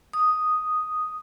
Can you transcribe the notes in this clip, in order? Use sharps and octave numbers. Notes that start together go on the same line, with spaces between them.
D#6